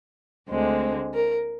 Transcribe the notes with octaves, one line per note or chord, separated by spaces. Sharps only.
D2 D3 G#3 C4
A#4